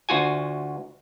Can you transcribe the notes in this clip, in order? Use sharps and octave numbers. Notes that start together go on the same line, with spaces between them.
D2 F4 F#4 G#5